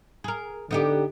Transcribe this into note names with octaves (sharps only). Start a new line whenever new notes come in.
G#4 A#4
D3 B3 D#4 G4